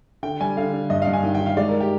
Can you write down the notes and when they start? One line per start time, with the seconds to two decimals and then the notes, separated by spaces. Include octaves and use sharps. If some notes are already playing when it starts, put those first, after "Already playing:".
0.23 D3 G5
0.40 G3 G#5
0.57 D3 F5
0.73 D3
0.90 G2 D#5
1.02 F5
1.07 G2
1.13 G#5
1.23 D#3 G5
1.35 G5
1.41 D#3
1.46 F5
1.57 G#3 D5
1.69 A#4
1.81 G4